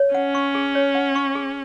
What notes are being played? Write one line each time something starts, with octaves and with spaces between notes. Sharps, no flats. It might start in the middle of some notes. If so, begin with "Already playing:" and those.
Already playing: C#5
C#4 F#5
C#6
G#4
C#5
F#5
C#6
G#4